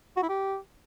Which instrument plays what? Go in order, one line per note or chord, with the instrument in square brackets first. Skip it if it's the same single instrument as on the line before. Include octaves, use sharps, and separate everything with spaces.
[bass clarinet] F#4
E4
G4